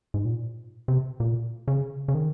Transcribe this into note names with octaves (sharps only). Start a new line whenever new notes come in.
G#2
A#2
C3
A#2
C#3
C#3
D#3